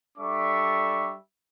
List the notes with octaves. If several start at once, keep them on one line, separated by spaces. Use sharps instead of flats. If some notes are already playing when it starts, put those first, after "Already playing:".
G3 D4 A4 E5 C#6 D6